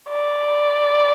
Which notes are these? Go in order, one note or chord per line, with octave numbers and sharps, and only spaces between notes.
D5